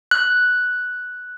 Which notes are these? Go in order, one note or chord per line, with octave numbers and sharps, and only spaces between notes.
F#6